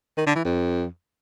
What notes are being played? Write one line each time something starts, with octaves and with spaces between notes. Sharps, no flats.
D#3
D3
E3
F2